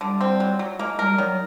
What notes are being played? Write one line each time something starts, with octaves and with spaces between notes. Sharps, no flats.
D3 G3
C4
F#3
F#3
G#3 A#3
G3 A#4
D#3 F#3